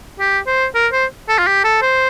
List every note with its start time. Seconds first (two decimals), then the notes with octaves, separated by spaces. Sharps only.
0.20 G4
0.47 C5
0.75 A#4
0.92 C5
1.29 A4
1.38 F4
1.47 G4
1.64 A4
1.82 C5